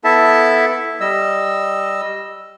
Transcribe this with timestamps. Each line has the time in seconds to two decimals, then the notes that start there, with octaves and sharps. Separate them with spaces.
0.04 B3 E4 A4 E5 A5
1.01 G3 D#5 E6